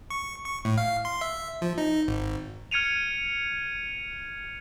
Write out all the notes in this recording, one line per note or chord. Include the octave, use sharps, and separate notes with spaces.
C#6
C#6
A2
F5
C6
E5
F3
D#4
G#1
F6 G#6 C#7 D#7 F7